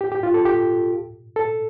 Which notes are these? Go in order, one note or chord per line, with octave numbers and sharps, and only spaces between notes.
G4
G4
F4
A4
G4
A4